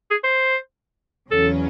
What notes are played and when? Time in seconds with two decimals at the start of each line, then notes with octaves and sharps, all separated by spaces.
0.11 G#4
0.24 C5
1.31 E2 C#3 F#3 C#4 A4